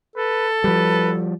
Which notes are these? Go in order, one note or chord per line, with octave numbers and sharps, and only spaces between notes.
A4 B4
F3 G3 B4